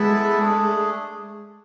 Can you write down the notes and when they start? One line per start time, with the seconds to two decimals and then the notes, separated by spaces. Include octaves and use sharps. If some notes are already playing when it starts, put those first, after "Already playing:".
Already playing: G#3 B3 E4 A4 E5
0.39 A3 D4 G#4